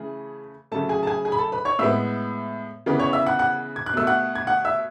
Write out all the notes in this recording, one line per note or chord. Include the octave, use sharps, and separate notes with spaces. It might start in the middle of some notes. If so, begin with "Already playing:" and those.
Already playing: C#3 E3 A3 G#4
C#3 F#3 A3 A4 A5
G#4 G#5
A5
G#4 G#5
G#4 G#5
B5
A4 A5
B4 B5
C#5 C#6
A2 G#3 B3 E5 E6
C#3 E3 B3
C#5 C#6
E5 E6
F#5 F#6
F#5 F#6
G#6
F#6
B2 A3 E6
F#5 F#6
G#6
F#5 F#6
E5 E6